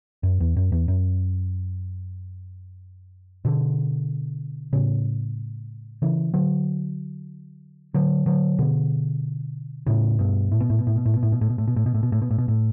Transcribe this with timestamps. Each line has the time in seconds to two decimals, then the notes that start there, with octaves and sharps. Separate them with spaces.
0.23 F#2
0.40 E2
0.57 F#2
0.72 E2
0.88 F#2
3.45 B2 D3
4.73 A2 C#3
6.02 C#3 E3
6.34 D3 F#3
7.94 D3 F#3
8.26 D3 F#3
8.58 B2 D3
9.86 A2 C#3
10.19 G2 B2
10.52 A2
10.60 B2
10.70 A2
10.79 B2
10.87 A2
10.96 B2
11.06 A2
11.14 B2
11.23 A2
11.32 B2
11.41 A2
11.50 B2
11.58 A2
11.68 B2
11.76 A2
11.86 B2
11.94 A2
12.03 B2
12.12 A2
12.22 B2
12.31 A2
12.38 B2
12.48 A2